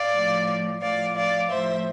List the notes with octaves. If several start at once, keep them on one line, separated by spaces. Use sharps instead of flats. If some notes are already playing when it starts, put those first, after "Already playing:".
Already playing: D5 F5
A2 F3
A2 F3 D5 F5
D5 F5
A2 F3 C5 E5